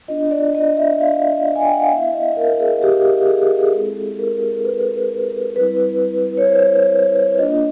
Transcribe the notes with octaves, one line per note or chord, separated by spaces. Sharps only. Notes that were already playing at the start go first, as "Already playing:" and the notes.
B3 D4 F4 D#5
D5
D#5
E5
F5
G#5
G5
F#5
F5
B3 E4 E5
D#5
A#4
G#4
G4
G#4
G#4
G#3 C4 E4 A4
A#4
B4
G3 C4 E4 B4
C#5
C5
A#3 D4 F4 D#5